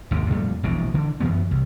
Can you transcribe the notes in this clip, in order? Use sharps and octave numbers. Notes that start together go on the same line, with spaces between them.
G#1 D#2 C3
F2 A#2 G3 A3
E1 A#1 B2 E3
D3 E3
F#2 E3 F#3 B3
C2